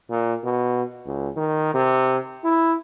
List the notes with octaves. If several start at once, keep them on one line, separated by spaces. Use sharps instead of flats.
A#2
B2
C#2
D#3
C3
E4